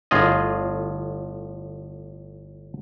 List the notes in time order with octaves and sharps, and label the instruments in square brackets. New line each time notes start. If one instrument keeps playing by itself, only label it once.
[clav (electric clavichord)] G1 A2 F4 G#4 D#5